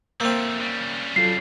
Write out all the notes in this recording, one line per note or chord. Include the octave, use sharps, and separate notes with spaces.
F3 A3 A#3 C4 E6
C#3 G3
F#3 F4 A4 C7